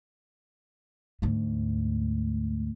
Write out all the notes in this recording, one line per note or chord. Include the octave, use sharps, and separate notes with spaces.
D2 G#2